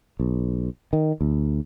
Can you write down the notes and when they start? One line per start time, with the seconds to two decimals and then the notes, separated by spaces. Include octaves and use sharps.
0.20 B1
0.93 D#3
1.21 D2